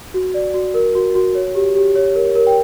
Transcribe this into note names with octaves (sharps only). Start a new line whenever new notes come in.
F#4
D5
F#4
A#4
F#4
F#4
C#5
G4
G4
C#5
A#4
A#4
G5